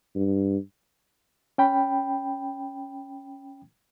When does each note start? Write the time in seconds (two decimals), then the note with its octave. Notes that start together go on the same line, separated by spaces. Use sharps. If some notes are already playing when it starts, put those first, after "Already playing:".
0.16 G2
1.58 C#4 G5 B5